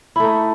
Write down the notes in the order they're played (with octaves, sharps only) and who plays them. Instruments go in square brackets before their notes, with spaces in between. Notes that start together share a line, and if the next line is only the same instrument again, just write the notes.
[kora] E4
A3
D#4